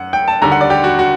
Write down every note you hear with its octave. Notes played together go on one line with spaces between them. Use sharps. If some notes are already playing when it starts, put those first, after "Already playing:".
Already playing: F#2 F#5
G5
A5
D#2 D3 G3 A#5
F#5
D5
G4
F#4
F#4